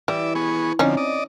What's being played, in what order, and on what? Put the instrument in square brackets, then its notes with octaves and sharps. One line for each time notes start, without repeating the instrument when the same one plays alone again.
[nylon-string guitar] E3 [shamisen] G3 [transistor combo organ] D5 E5
[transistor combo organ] B3 G#4 C#6
[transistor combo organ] D3 F3 [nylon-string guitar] C4 [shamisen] C#4 D#4
[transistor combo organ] D5 D#5